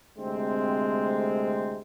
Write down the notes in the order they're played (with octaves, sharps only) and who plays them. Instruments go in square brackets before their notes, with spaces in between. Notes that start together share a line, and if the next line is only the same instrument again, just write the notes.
[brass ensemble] D2 C3 G#3 A3 C4